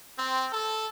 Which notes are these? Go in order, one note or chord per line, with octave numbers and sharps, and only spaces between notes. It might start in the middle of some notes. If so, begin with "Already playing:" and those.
C4
A4